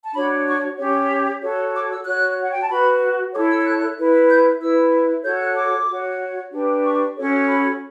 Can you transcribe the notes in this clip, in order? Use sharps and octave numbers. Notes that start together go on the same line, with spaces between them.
A5
D4 F#4 C#5 B5
C#6
C#4 G4 C#5
F#4 A4 C#5
D6
E6
F#4 C#5 F#6
F#5
G5
A5
F#4 B4 B5
E4 A4 C#5 D6
E6
E6
F#6
E4 B4
G6
E4 B4 E6
F#4 A4 C#5 G6
F#6
D6
F#4 C#5
D4 G4 B4
C#6
C#4 F#4 A4 C#5
B5